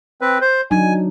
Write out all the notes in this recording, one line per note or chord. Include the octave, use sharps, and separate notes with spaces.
C4 B4
C5
F#3 D4 D#4 G#5